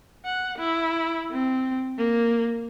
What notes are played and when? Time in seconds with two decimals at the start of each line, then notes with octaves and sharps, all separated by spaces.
0.25 F#5
0.58 E4
1.31 C4
1.98 A#3